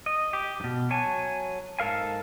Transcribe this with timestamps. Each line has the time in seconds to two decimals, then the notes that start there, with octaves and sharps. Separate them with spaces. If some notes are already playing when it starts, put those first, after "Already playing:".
0.06 D#5
0.33 G4
0.60 G2 B2
0.90 F#3 C#5 G#5 A5
1.79 G#2 A4 A#4 F5 G#5